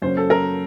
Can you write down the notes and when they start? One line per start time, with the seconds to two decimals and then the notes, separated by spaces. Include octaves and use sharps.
0.02 F#2 C#3 F#3 A#3 C#4 C5
0.17 A4
0.30 A#4